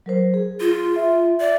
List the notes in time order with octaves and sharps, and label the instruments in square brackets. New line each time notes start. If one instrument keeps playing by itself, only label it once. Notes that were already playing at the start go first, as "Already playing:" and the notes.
[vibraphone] F#3 A#4 C5
G#4
[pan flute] F4
[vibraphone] E5
[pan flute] D5